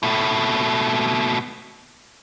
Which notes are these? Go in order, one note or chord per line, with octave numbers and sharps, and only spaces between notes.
B2 A3